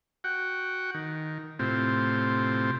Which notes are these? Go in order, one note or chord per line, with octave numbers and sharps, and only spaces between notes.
F#4 F#5 G5
D#3
A2 C3 C4 F4